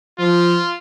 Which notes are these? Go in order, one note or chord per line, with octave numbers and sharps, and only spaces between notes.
F3 F4